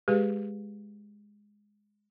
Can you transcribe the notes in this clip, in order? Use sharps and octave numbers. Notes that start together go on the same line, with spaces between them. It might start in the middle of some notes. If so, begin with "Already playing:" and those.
G#3 G4 G#4 B4 F5